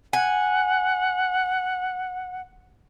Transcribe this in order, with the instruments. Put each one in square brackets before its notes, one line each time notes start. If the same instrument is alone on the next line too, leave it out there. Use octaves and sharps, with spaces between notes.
[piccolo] F#5 [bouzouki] G#5